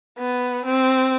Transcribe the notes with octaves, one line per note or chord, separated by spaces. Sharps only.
B3
C4